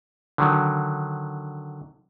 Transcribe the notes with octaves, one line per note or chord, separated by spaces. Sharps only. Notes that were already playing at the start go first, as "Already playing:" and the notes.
D3 D#3 F#3